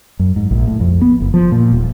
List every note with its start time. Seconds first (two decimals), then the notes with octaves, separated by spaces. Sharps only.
0.19 F#2
0.36 G#2
0.51 A#1
0.67 A2
0.80 F2
1.02 B3
1.20 F#1
1.34 F3
1.52 A#2
1.72 D#1